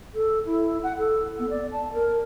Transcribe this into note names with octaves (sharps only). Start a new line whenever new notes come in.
A4
E4
F#5
A4
B3
D5
A5
A#4